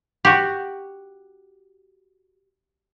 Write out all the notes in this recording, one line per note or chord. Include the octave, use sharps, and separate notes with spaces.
F#4 G4